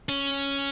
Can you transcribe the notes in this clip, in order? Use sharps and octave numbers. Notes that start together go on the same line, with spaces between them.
C#4